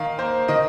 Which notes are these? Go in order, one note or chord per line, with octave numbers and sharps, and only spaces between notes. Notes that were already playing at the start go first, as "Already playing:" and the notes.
Already playing: D#3 F5
A#3 C5
D#3 D#5